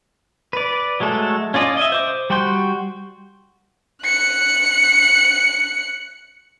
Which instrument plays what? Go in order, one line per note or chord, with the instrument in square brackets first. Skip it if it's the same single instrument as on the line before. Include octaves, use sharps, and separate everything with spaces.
[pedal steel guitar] B4 D5
F#3 G#3 A3 A4
C#4 F4 D5 D#5
D#5 E5
C5 D6
G3 F#4 G5 C6 G6
[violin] F#6 C#7